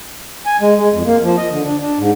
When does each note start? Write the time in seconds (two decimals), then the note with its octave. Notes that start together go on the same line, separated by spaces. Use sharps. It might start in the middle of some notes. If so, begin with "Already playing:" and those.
0.46 G#5
0.61 G#3
0.77 G#3
0.93 F2
1.06 A#3
1.23 F3
1.37 D#5
1.51 D3
1.64 D4
1.81 D4
1.98 G#2